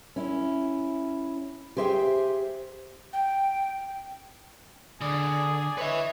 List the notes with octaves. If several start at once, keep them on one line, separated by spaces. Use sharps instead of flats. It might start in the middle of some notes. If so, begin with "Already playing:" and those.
C#4 E4
G4 G#4 C5 E5 F#5 G5
G5
D3 G#4 D5 G#5
B4 C#5 D#5 E5